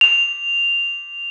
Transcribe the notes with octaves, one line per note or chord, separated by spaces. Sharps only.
F7